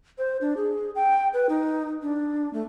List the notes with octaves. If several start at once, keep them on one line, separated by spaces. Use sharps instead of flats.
C5
D4
G#4
G5
B4
D#4
D4
A3